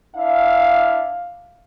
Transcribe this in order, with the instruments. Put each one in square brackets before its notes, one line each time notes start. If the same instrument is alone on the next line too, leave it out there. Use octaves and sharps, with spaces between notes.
[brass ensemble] D4 E4 E5 F5